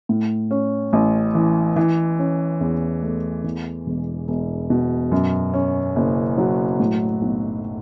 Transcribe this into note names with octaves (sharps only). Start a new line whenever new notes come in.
A2
C#4
A1
E3
E3
C#4
E2
A3
E2
E1
E1
B2
F#2
C#4
F#1
F#3
A2
B1